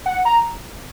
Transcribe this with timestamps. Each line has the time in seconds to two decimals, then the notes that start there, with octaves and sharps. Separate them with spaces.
0.06 F#5
0.25 A#5